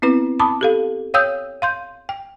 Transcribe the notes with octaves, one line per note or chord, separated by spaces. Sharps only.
B3 C4 E4 B4
A5 B5 D6 D#6
G4 A4 F5
C#5 F5 G5 D#6 E6 G6
F5 C6 G6
G5